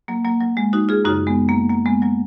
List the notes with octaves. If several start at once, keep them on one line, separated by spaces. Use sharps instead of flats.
F#3 A#3
F#3 A#3
F#3
G#3
D#4 F#4
F4 G#4
F#2 C#3 D#4 F#4
G#3 B3
F#3 A#3
F#3 A#3
G#3 B3
F#3 A#3